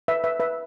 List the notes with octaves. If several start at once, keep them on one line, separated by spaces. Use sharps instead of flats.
B4 E5
B4 E5
B4 E5